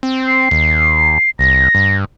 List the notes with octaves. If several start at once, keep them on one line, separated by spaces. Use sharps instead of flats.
C4
C7
D#2
C2 A#6
G2